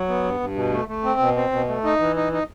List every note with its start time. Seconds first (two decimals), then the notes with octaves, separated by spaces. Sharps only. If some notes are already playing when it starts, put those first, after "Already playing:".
Already playing: F#3
0.08 B3
0.24 G2
0.40 G2
0.55 B2
0.71 A3
0.88 A3
1.04 C4
1.20 B2
1.36 C4
1.52 B2
1.68 A3
1.84 D#4
1.99 E3
2.16 D#4
2.33 D#4